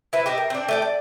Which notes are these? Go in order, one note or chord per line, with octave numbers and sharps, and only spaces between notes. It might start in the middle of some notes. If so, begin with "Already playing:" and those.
E4 B4 C5
G4 D#5 E5
A#4
C4 D4
A3 D5 G5
D5